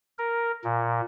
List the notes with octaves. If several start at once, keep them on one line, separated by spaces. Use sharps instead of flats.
A#4
A#2